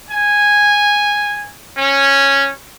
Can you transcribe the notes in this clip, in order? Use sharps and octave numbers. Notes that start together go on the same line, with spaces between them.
G#5
C#4